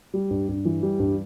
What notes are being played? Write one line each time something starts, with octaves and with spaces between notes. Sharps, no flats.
G3
G2
G2
E3
G3
G2